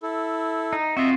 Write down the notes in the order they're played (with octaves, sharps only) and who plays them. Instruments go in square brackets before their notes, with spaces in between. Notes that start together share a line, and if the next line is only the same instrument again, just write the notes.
[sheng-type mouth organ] E4 A4
[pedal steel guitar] D#4
[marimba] C4 [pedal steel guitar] F4 F#4 [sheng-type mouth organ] D#5 E5